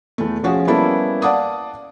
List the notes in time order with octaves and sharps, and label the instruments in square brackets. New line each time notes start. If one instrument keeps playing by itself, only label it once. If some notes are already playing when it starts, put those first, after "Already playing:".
[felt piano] E2 A3
F3 C#4 F#4 G#4
G3 A#3 B3 C#4 E4 A4
D5 F5 F#5 A5 D6 D#6